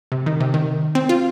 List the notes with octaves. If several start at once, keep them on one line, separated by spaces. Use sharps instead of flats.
C3
D#3
C3
D#3
C4
F4